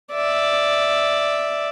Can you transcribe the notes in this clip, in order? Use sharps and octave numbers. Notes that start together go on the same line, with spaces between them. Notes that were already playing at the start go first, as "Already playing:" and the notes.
D5 E5